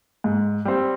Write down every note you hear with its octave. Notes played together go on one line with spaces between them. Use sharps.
G#2
G3 C4